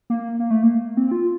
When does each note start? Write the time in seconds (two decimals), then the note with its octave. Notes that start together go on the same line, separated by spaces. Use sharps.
0.10 A#3
0.39 A#3
0.51 A3
0.63 A#3
0.97 C4
1.11 F4